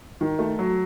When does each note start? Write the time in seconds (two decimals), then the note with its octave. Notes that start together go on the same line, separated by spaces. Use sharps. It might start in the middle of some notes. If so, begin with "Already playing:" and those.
0.21 D#3
0.39 A3
0.59 F#3